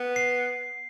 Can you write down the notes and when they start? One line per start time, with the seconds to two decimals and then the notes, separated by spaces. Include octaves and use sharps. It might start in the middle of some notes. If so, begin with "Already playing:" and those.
Already playing: B3
0.16 C7